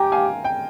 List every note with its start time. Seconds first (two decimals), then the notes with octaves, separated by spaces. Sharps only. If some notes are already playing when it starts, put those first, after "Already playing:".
Already playing: G4 G5 G#5 A#5
0.12 F5 G#5
0.44 G5